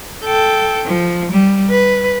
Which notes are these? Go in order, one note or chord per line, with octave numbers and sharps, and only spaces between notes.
A4 G5
F3
G3
B4